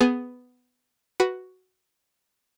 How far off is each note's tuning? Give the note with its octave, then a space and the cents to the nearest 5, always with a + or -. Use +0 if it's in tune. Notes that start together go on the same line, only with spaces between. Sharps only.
B3 +10 G#4 +10
F#4 +5 B4 +0 B5 +0